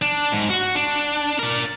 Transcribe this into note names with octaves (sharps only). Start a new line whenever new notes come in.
D4
G#2
F#4
D4
A#4 D5